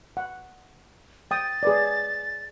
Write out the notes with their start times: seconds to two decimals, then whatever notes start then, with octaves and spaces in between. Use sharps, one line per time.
0.17 F#5
1.31 G5 D#6 A6
1.63 G#4 B4 D5